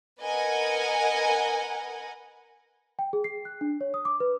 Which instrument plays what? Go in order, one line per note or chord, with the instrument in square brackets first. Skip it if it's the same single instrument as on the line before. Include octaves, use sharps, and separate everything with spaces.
[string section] A#4 B4 D#5 F#5 G#5
[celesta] G5
G#4
C7
F#6
D4
C#5
D#6
D6
B4